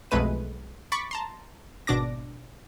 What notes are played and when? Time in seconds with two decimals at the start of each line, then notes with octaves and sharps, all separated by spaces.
0.11 B1 F2 G#3 A3 B4 D#7
0.92 B5 C#6 D6 A6 B6 C#7
1.11 A5 A#5 C6
1.87 G#1 B2 D4 D6 A#6